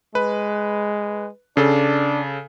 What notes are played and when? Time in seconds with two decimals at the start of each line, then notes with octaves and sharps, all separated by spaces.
0.15 G#3 B4
1.57 C#3 D4 A4